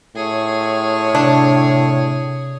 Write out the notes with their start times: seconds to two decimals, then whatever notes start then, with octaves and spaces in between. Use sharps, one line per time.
0.15 A2 G#4 C#5
1.15 C3 D4